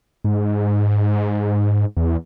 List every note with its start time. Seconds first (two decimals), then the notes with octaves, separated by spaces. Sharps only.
0.24 G#2
1.97 E2